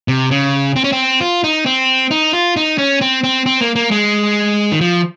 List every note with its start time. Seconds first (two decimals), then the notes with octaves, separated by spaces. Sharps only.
0.08 C3
0.31 C#3
0.76 C4
0.84 C#4
0.92 C4
1.21 F4
1.44 D#4
1.66 C4
2.11 D#4
2.33 F4
2.57 D#4
2.78 C#4
3.01 C4
3.24 C4
3.46 C4
3.61 A#3
3.76 A#3
3.91 G#3
4.72 D#3
4.81 F3